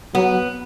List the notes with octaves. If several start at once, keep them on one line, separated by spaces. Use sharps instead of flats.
F#3 B3